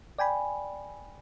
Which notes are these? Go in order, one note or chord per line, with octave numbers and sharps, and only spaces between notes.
D5 G5 G#5 B5